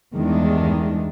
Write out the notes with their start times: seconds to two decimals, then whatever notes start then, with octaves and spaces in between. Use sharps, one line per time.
0.14 E2 G2 D#3 E3 G#3 D4